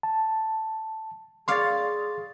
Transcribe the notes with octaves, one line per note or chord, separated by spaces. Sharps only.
A5
G#4 C#5 D5 F5 C6 A6